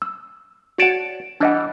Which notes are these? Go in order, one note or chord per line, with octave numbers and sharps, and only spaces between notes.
E6
F#4 C#5 D5 F#5 A5
E3 G3 D4 D#5 F#5